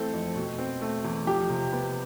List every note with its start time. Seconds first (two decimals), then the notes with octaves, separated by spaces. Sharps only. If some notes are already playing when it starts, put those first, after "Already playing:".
Already playing: E3 A3 C4 A4
0.13 F2
0.35 B2
0.58 C4
0.82 A3
1.05 E2
1.27 F3 G4
1.50 C3
1.72 B3